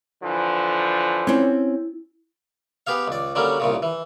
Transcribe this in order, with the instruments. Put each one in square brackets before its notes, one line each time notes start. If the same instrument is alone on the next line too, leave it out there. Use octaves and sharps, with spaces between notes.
[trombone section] D3 E3 F3
[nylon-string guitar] C4 C#4 [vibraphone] E4
[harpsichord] B3 G4 G#4 F5
C#2 D5
D3 F#3 G3 A#3 C#4
C2 A#2 C#3
E3